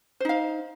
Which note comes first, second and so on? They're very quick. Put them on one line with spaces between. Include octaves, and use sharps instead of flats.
C5 D#4 F5